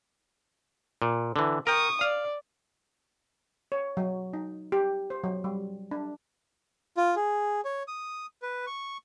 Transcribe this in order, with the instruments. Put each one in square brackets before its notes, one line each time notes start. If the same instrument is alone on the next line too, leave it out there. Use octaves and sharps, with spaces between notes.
[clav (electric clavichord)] A#2
D3 E3
[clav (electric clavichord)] A#4 G5 [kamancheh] C#6 D#6
[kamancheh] D5 [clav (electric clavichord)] F5
[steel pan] C#5
F#3
D#4
G4
C5
F#3
G3
D4
[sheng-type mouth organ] F4
G#4
C#5
D#6
B4
C#6